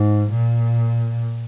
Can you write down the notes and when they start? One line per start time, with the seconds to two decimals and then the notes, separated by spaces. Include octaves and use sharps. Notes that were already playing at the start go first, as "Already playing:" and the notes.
Already playing: G#2
0.31 A#2